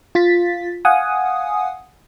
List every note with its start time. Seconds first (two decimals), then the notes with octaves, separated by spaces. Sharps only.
0.15 F4 A6 B6
0.85 F5 F#5 G#5 D#6